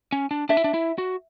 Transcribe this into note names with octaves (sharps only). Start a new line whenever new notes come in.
C#4
D4
D4 E5
E4
D4
E4
F#4